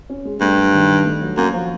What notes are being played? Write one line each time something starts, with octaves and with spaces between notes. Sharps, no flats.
C#4
G#3
G2 A3
F#3
D#3
D#3
A3
F#3
F#2 A#3
F3